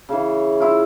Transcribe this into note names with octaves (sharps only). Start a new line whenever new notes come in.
C#3 E3
E4 F4